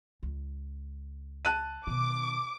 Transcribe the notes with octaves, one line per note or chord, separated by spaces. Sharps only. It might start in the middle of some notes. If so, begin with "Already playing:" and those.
C#2
A5 F#6 D#7
B2 D#3 D6